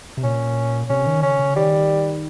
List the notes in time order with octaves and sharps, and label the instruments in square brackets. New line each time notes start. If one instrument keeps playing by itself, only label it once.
[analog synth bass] C3
[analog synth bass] A#2 [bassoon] C#4
[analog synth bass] C3 [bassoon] C#4
[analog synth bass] D#3
[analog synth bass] C#3 [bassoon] C#4
[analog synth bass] C#3
[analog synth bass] D#3 [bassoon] G3